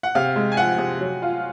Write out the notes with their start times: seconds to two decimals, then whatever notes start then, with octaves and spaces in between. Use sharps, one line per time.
0.03 F#5
0.15 C3 F5
0.36 G#3
0.52 G#5
0.57 F3 F#5
0.78 C3
1.00 F#3
1.22 F4